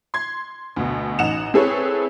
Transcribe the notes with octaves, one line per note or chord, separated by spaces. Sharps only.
C6 G#6
D2 B2
A1 D#4 F#5 E7 F7
C4 E4 G#4 A4 B4 C#5